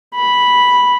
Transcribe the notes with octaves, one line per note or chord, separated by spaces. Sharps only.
B5